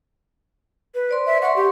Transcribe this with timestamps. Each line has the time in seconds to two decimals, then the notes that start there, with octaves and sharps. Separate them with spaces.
0.95 B4
1.09 C5 D5 C6
1.26 E5
1.42 F#5 C6 C#6
1.56 G4